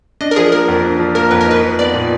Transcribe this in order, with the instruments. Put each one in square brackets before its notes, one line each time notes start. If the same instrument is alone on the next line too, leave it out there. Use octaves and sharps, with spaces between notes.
[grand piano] D4 [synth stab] D#5
[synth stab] A#4
[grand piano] F3 [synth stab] G#4
[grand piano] A#3 [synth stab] A#4
[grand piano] F2
D4
F3
[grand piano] A#3 [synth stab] A#4
[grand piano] F2 [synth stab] B4
[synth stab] A#4
[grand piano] D#4 [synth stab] B4
[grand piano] F3
[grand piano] B3 [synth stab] D5
[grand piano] A#2